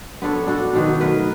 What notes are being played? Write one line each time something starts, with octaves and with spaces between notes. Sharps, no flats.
B3 D4 A4 C#5
D4 F#4 A4
B2 D#3 F#3 B3
F#3 A3 A#4 B4